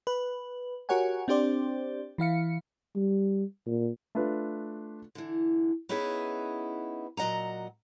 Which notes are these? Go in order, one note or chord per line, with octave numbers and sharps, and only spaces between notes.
B4
F#4 G4 A#4 C#5 F#5 G#5
C4 D4 G4 C5 D5
E3 E4 F5 C#7
G3
A#2
A3 D4 F4 B4
D3 E3
B3 C#4 D#4 E4 G#4 B4
A#2 F#3 D#5 F#5 A#5